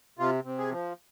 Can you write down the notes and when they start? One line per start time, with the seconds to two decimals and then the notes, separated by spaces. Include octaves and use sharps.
0.19 C3 F4
0.44 C3
0.58 G#4
0.71 F3